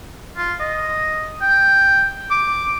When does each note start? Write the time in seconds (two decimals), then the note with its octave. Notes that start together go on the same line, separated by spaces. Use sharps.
0.37 F4
0.60 D#5
1.41 G5
2.31 D6